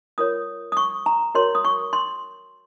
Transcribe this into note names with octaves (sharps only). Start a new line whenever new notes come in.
F4 A#4 C#5 D#6
D#6
C#6
A#5
F#4 A#4 C#5 C6
D#6
C#6
C6